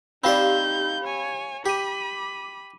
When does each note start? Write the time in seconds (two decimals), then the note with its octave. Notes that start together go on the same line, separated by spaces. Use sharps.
0.24 C4 D#4 G4 C5 D5 F5 B5 G6
1.04 C#5 G#5
1.66 G4 B5 D6 D#7